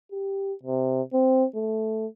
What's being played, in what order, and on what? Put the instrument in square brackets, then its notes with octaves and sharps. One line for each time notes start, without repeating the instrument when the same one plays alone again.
[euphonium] G4
C3
C4
A3